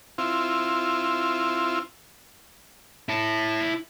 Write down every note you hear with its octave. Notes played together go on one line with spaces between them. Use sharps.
C4 E4 F4
E4 A5